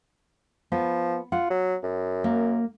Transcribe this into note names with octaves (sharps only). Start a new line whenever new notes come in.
F3 B3
F4 F#5
F#3
F#2
A#3